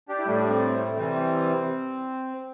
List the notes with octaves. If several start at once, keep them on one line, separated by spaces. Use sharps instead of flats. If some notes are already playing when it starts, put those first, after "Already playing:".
D4 G4
E4
A2 G3 A3 D4
C4
A3
C3 E3 G3 C4